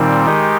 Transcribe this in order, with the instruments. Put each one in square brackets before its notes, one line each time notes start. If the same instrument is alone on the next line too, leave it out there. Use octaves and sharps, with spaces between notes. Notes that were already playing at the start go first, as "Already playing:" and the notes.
Already playing: [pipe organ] A#2 G3 C4 [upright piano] D#3
[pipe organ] D#3 G#3 D#4 G4